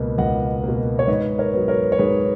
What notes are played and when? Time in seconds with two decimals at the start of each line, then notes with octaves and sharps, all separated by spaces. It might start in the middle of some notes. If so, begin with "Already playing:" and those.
Already playing: C#2 B2 A#3
0.18 C#2 D#5 F#5
0.64 B2 A#3
0.99 C#5
1.08 G#2 B4 D#5
1.39 A#4 C#5
1.53 F#3 B3
1.68 A#4 C#5
1.92 C#5
1.98 G#2 G#4 B4